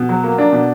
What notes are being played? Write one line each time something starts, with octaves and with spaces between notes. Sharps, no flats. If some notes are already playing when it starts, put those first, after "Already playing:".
Already playing: B2
F#3
A#3
D4
B2